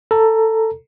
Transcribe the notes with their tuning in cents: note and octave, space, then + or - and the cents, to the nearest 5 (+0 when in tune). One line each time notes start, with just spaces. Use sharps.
A4 +15 A#5 +5